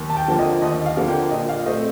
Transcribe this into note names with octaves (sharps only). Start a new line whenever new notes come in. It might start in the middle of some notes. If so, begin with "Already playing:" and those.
Already playing: D#2
A5
G5
D3 F3 A#3
D#5
D#2 D#5
F5
D3 F3 A#3
G5
A#2 D#5
F5
A3 C4 D#5